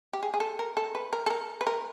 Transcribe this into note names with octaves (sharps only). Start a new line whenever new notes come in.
G4
G#4
G#4
A4
A#4
A4
B4
A#4
A4
A#4
B4
A#4